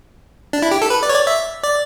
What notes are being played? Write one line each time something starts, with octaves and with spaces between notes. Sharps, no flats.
D4
E4
G4
A4
B4
D5
C#5
D5
E5
D5